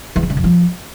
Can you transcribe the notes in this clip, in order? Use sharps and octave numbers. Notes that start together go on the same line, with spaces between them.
E2
D#3
C#3
F2
F3